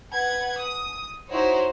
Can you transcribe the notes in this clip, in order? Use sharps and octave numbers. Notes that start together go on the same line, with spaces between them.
B4 F#5 G#6
D#6
D#4 E4 F#4 C5 C#5